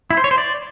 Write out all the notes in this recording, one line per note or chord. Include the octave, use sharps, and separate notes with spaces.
E4
C5
C#5
C5
D5